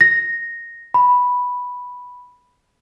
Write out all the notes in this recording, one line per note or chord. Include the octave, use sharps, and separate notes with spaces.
A#6
B5